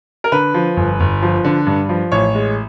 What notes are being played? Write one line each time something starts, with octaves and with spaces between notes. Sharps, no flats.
A#4
D3 B4
F3
G1
G1
F3
D3
G2
F3
A1 C#5
G#3